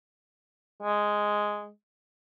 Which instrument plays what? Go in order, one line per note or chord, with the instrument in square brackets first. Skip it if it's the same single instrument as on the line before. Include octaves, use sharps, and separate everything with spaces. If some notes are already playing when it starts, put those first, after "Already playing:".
[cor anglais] G#3